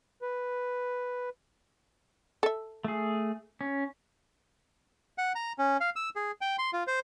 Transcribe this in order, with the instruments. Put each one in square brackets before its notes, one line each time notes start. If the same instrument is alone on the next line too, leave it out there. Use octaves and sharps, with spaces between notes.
[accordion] B4
[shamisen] A4 E5
[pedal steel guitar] A3 G#4
C#4
[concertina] F#5
A#5
C#4
F5
E6
G#4
G5
C6
F4
C5